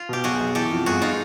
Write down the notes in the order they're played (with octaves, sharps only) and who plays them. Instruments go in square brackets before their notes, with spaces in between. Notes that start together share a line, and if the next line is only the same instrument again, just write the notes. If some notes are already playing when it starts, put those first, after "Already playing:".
Already playing: [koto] F4
[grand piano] B2 [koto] G4
[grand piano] B1 [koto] F#4 G#4
[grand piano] B1
[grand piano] E3 [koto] G4 A4
[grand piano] F2
[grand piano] G1 [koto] F#4 G#4
[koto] D#4 F4